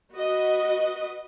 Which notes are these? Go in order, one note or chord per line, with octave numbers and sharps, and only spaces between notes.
F#4 B4 D#5